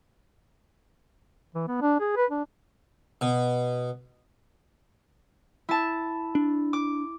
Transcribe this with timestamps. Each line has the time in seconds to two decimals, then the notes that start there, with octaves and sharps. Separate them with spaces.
1.55 E3
1.68 B3
1.81 D4
2.00 G#4
2.16 B4
2.30 D4
3.21 B2
5.69 E4 A5
6.35 D4
6.73 D6